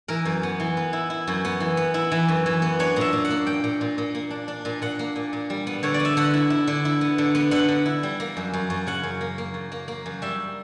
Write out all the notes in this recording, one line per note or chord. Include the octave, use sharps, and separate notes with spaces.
E3 A#4
F#2
B3
E3
B3
E4
E4
F#2
B3
E3
B3
E4
E3
F#2
E3
B3
D4 C#5
A#2 E5
A#2
F#5
A#3
A#2 G5
A#2
A#2
A#2
A#3
D4
D4
A#2
A#2 F#5
A#3
A#2
A#2
G3
B3
D3 C#5
D5
B3
E5
D3 F#5
E4
E4
D3
E4
B3
D3
B3
D3 F#5
D3
E4
G3
A#3
F#2
F#2
F#2
C#3 F#5
F#2
A#3
A#3
F#2
A#3
A#3
F#2
G3 E5